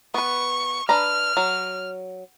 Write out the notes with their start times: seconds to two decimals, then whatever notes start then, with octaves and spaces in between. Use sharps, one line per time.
0.14 B3 B4 C#6
0.89 D4 B4 A#5 F6
1.37 F#3